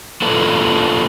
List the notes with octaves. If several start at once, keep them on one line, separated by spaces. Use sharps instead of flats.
A#3 D4 E4 F4 A4 B4